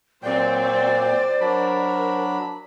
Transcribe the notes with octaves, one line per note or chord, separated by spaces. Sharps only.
A#2 F#3 C4 C5 D5 G5
F#3 D4 A#4 B5